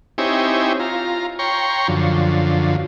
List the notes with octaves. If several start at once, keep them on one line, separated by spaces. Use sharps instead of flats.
C4 D#4 E4 G4 C#5 G#5
F4 A#5
C#5 G5 A#5 C6 C#6
F#2 D3 F3